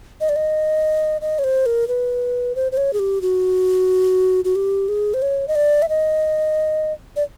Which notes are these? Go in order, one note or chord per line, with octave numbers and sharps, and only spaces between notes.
D#5
D5
D#5
D#5
C#5
C5
A#4
B4
C5
C5
C#5
G#4
G4
F#4
F#4
G4
G#4
C5
C#5
D#5
D5
E5
D#5
D5